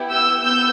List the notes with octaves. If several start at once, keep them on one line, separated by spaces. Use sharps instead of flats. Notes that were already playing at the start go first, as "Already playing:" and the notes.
Already playing: B3 E4 G4
E6 G6
B3 E6 G6